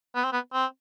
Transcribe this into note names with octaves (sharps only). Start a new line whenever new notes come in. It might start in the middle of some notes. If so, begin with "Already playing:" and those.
B3
C4
B3
C4